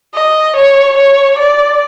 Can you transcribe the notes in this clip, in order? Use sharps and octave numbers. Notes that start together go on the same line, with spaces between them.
D#5
C#5
C#5
D5